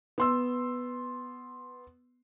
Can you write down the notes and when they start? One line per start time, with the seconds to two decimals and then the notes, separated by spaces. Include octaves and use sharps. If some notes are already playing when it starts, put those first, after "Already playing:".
0.18 B3 C6 E6